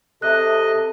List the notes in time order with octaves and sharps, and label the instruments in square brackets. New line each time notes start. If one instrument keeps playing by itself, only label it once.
[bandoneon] C3 D#5 [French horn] A4 [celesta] E5 F#6